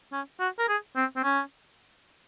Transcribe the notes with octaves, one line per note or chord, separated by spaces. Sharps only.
C#4
F#4
A#4
G#4
C4
C4
C#4